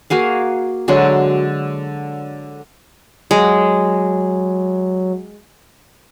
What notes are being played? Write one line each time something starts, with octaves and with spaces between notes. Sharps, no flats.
A#3 F#4 G#4 F5
D3 F#3 G#3 D4
F#3 G#3